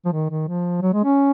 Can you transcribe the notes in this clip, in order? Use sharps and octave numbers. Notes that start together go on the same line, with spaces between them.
F3
D#3
D#3
F3
F#3
G#3
C#4